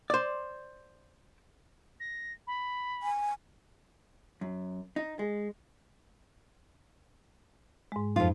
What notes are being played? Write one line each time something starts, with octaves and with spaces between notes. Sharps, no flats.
C5 D5
A#6
B5
G#5
F#2
D#4
G#3
G#2 G#3
F2 D#4 F4